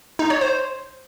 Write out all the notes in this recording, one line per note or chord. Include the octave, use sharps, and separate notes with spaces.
D#4
C#5
C5